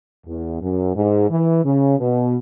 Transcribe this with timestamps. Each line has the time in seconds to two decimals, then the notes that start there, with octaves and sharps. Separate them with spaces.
0.27 E2
0.61 F#2
0.96 G#2
1.30 E3
1.64 C#3
2.00 B2